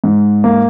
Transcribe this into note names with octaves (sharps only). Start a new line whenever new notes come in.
G#2
A#3